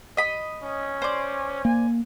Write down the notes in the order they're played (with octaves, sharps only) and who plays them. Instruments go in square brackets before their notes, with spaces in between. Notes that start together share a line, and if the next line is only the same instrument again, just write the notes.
[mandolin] D#5 B5
[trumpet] C#4
[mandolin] C5 D5
[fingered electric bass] A#3 [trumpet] G#5